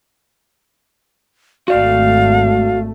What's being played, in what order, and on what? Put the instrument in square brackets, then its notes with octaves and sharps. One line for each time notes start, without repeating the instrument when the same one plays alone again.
[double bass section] G#1 A3 [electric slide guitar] F#4 D5 [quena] F5